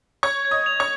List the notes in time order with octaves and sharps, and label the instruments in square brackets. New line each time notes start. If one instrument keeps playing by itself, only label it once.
[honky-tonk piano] C#5 C#6 [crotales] G#6
[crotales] G#6
[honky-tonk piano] D#5 D#6
[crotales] F7
[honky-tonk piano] C#5 C#6